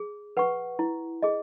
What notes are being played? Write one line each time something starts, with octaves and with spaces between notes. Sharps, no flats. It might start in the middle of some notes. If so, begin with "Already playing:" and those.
Already playing: G#4
B4 F#5 C#6
E4
G#4 D#5